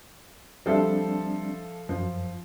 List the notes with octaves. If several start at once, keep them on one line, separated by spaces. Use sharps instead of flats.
F3 G3 C4 D4 A4 E5
F#2 F3